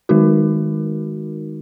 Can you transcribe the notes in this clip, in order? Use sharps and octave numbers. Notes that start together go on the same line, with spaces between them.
D#3 G#3 D#4 F#4 A#4